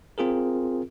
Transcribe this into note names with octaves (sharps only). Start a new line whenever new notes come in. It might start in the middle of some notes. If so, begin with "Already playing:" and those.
C4 F4 G#4 A#4